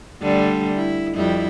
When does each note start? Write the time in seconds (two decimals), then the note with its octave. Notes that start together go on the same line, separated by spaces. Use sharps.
0.22 D3 G3 A3
0.76 E4
1.14 F2 G3 E4